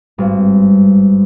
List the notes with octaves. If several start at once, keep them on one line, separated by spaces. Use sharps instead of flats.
G#1 G2